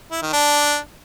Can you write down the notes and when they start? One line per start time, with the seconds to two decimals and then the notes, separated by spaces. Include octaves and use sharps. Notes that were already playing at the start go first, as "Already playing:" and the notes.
0.11 E4
0.22 D#3
0.33 D4